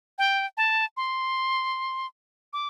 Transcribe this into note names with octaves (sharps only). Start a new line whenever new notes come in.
G5
A5
C6
D6